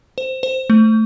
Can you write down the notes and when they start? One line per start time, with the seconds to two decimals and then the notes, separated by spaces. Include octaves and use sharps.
0.18 C5
0.43 C5
0.70 A3